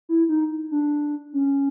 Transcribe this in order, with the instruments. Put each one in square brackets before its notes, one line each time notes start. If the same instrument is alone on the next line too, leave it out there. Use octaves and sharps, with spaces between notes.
[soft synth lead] E4
D#4
D4
C#4